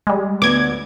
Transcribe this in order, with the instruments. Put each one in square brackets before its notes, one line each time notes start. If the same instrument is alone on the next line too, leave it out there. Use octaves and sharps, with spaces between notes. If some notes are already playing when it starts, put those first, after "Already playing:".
[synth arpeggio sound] G3 G#3
[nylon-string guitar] D2 B3 [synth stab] D6 G#6